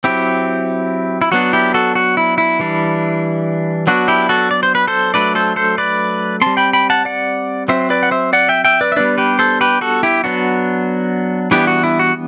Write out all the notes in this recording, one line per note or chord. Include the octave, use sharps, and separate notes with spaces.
F#3 C4 E4 G4
E4
F#3 B3 D4 F#4
E4 G4
F#4 A4
F#4
E4
E4
E3 G3 D4
F#3 B3 D4 F#4
E4 G4
F#4 A4
D5
C5
B4
A4 C5
F#3 A3 D4 B4 D5
A4 C5
A4 C5
B4 D5
G3 C4 A5 C6
G5 B5
G5 B5
F#5 A5
D5 F#5
F#3 C4 C5 E5
B4 D5
F#5
C5 E5
D5 F#5
E5 G5
E5 G5
B4 D5
E5
G3 B3 D4 B4 D5
G4 B4
A4 C5
G4 B4
F#4 A4
E4 G4
F#3 B3 D4 F#4
E3 G3 B3 D4 E4 G4
F#4
E4
F#4